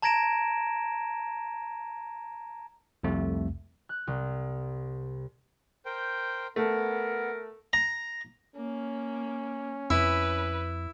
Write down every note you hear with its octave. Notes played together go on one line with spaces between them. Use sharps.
A5 A#5 G#6 A#6 D7 E7
C2 F2 C3 A3
F#6
C2
A#4 C5 G5
A3 B3 A#4
A#5
A#3 C#4
F2 E4 B4